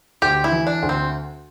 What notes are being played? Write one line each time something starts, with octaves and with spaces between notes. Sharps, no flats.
D2 G4
E4
E3
D4
D2
C4